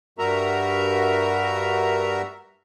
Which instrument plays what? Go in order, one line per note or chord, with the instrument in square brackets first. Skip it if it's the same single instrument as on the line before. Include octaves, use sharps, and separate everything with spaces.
[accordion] G2 G3 F#4 A#4 E5 A#5